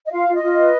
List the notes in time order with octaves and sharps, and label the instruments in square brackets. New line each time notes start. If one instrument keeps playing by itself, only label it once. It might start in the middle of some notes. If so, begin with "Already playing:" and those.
[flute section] D#5
F4 F5
F4
D#5
F4
B4